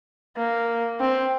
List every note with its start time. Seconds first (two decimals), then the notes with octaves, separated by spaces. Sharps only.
0.37 A#3
1.00 C4